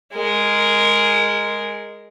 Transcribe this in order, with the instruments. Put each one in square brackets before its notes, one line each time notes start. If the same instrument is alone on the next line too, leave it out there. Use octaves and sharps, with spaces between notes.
[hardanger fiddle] G#3 A#4